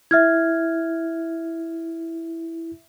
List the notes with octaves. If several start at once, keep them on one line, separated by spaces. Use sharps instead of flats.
E4 E5 F6 G#6